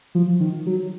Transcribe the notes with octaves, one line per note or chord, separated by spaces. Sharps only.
F3
D#3
F#3